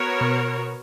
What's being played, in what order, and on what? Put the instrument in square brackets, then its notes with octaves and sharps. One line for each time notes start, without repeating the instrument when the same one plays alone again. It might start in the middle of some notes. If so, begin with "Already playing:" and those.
Already playing: [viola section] B3 F#4 A#4 C#5
[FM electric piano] B2